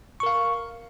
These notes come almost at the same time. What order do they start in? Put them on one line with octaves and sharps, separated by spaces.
C#6 A#4 F5